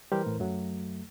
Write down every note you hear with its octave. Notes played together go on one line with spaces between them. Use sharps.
E3 G3 G4 A#4 C5
A2
F#2 F#3 A3